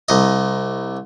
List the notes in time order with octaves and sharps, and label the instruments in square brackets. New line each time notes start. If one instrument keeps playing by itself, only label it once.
[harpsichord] C2 D#5